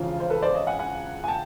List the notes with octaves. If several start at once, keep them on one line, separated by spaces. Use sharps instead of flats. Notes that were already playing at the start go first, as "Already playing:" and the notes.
Already playing: E1 E2 C#3 F3 F4
C5
A4 B4
C5 D5
C#5 D#5
F#5 G#5
F#5 G#5
G#5
G5 A5